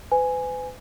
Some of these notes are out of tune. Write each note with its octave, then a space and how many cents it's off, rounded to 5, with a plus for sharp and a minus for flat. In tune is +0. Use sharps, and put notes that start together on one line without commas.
B4 +40 G#5 +0